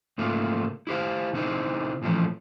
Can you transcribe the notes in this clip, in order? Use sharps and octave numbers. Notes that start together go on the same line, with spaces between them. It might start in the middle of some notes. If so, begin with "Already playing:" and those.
G#2 C#3 A3 A#3 F4
E4 G4 C5 F5
C#3 C4 D#4 E4 C5
A#2 E3 F3 A3 C#4